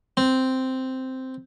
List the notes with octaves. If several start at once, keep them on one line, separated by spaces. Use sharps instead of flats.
C4